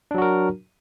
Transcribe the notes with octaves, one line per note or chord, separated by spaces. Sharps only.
F#3 D4 F#4 A#4